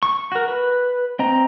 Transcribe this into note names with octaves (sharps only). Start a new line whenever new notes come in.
C#6
F#4 A#4
B4
C4 D#5 A#5